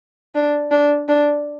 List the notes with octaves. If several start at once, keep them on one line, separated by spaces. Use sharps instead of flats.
D4
D4
D4